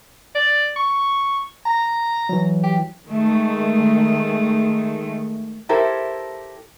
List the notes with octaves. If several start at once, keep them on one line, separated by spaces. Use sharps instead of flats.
D5
C#6
A#5
E3 F#3
G4
D#3 G#3 A3
E4 G4 A4 A#4 C5